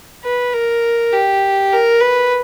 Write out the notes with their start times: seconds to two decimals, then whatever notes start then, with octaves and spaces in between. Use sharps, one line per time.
0.24 B4
0.54 A#4
1.13 G4
1.72 A#4
2.01 B4